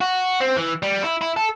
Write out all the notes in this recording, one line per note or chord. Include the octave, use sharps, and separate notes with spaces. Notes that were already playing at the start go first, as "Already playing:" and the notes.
F#4
C4
E3
G3
E4
E4
A4